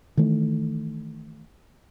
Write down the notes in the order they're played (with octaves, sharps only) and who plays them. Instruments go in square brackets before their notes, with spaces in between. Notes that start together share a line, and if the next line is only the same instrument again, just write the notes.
[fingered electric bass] D#3 E3 A3